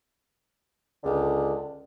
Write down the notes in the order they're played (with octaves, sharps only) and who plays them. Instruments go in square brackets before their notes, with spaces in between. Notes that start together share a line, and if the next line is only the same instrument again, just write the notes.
[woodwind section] C#2 D3